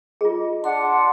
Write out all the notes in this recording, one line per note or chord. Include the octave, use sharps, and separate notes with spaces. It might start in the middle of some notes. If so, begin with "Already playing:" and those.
F4 G#4 D#5
D4 F#5 C6